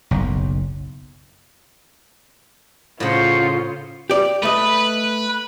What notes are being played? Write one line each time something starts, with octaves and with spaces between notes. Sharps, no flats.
F#1 B1
A2 C#3 F4 C5 F#5
G4 D5
A3 B4 D#5